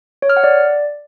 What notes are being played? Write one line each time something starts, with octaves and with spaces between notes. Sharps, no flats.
C#5
F6
F#5
D5